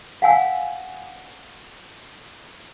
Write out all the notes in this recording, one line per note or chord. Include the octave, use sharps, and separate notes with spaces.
F5 F#5 G#5 E6